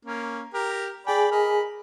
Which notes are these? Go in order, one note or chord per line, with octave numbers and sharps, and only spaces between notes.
A#3 C#4
G4 A#4
G#4 D5 G5 G#5 B5
A#4 D#5 B5